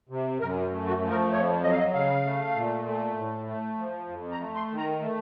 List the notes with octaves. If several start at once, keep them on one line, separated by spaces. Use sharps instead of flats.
C3
F#2 A#4
A3
F#4
F3
A#4
F2 C#5
F#3 D#5
F5
D#5
C#3 F5
A3
A#2
A3
A2
A3
F3
F2
A#5
A3
C6
D#3
A#5
A3